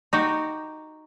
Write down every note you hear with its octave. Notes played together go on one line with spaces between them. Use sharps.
D#4 F#4 G4